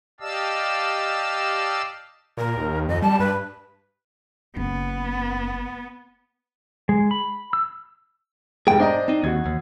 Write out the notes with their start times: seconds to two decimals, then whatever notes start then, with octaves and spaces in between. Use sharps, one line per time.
0.20 G4 D5 D#5 F5 A5 E6
2.37 A#2 A#4
2.57 D#2
2.89 F2 D#5
3.02 G3 A5
3.20 G2 B4
4.56 F#1 B3
6.89 G#3
7.11 B5
7.53 E6
8.67 F1 G#2 G#4 G5
8.80 D4 C5 D#5 A#5
9.08 C4 D#4
9.24 D#2 F#4 G#6
9.46 D#2